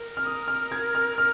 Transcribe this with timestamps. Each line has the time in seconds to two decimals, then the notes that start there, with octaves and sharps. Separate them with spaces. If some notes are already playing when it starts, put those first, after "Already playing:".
Already playing: A#4
0.17 F6
0.25 D#6
0.48 F6
0.72 G#6
0.95 F6
1.18 F6